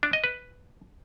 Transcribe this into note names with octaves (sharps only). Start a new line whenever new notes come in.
D4
D#5
B4